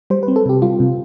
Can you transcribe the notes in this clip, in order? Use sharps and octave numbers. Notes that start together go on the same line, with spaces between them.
G3 C5
B4
C4
A4
C3 G4
G3 F4
C3